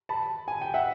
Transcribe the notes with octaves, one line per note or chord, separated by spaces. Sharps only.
A5 B5
G#5
G5
E5 F#5